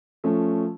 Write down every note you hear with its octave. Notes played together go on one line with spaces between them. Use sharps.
F3 A3 C#4